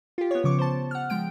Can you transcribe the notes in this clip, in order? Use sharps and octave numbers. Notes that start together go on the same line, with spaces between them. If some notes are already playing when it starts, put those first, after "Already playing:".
F4 G4
B3 C#5
C#3 F3 C#6 D6
C5 A5
F#5 F6
F3 G#3 G5 D7